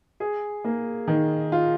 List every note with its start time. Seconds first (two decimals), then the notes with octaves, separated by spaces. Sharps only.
0.20 G#4
0.65 A#3
1.08 D#3
1.52 F4